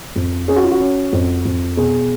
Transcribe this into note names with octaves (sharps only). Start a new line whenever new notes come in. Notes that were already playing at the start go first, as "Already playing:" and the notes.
F2
C#4 G#4
F#4
F4
F#4
C#4
F2
F2
B2 G#4